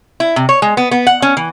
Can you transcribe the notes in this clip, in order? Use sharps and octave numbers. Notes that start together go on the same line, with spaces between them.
E4
C3
C#5
G#3
B3
B3
F#5
C#4
E3